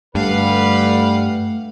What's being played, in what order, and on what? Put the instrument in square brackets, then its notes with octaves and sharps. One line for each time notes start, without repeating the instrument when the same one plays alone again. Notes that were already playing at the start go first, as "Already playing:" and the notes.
[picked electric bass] G2 [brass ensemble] D3 G3 B4 [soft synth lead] A3 [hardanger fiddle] F5 F#5